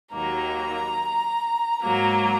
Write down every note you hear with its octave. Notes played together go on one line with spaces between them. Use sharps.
D#2 D#3 F#3 A#3 A#5
G#2 F#3 A#3 A#5